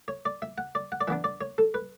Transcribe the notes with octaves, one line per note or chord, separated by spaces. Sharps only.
C#5
D5
E5
F#5
D5
F#5
D5
E3 B3 D4 E5
D5
C#5
A4
B4